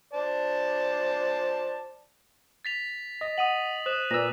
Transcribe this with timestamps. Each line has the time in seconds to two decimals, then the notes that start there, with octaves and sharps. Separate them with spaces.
0.14 C5 D5 A5
2.65 A6 B6 F7
3.21 D#5
3.38 F#5 D#6 D#7 F#7
3.86 C5 D#6 F#6 E7
4.11 A#2 B4 D5 E6 A#6